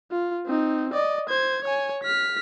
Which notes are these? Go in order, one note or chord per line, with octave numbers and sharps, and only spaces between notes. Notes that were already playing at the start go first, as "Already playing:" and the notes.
F4
C4 D#4
D5 D#5
C5 G#6
C#5 G#5
F6 B6